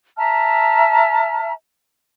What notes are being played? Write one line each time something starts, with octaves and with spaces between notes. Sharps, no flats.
E5 A5 A#5 F6